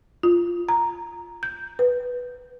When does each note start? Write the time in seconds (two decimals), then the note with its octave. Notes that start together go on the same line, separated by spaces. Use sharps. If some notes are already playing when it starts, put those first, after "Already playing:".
0.23 F4
0.69 A#5
1.43 G6
1.79 B4